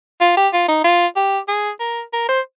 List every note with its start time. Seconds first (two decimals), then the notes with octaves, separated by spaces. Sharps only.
0.21 F4
0.37 G4
0.53 F4
0.68 D#4
0.84 F4
1.16 G4
1.48 G#4
1.80 A#4
2.13 A#4
2.29 C5